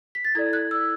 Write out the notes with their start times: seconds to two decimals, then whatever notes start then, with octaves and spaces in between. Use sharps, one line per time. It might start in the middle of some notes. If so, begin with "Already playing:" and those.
0.15 B6
0.24 A6
0.35 E4 A4 D5 G#6
0.53 F#6
0.71 E6